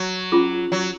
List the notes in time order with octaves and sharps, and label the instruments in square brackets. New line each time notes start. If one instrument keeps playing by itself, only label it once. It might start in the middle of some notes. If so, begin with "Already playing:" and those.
Already playing: [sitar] F#3
[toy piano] C#4 F4 G#4
[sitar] F#3